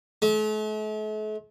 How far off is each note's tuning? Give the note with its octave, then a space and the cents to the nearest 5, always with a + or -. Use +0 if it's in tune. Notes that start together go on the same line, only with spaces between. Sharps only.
A3 -45